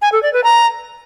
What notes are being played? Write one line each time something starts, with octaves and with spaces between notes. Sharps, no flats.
G#5
A4
D5
B4
A#5